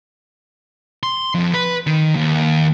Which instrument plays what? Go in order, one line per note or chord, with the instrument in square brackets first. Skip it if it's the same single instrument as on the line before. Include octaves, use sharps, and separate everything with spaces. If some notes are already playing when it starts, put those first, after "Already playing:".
[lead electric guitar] C6
F2
B4
D#3
D#2